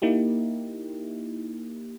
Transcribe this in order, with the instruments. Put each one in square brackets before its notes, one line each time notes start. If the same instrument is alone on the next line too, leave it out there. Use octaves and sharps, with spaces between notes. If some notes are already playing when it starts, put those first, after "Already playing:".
[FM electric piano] A#3 D#4 E4 G4